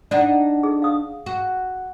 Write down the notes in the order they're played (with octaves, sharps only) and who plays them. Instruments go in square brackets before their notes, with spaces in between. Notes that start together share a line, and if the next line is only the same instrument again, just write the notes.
[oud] D4 D#4 [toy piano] D5 F#5
[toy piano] G#4
G#4 F5 D#6
[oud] F#4